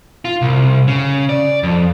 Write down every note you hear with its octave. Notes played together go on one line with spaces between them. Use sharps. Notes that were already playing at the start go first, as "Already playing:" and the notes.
F4
C2
C#3
D5
F2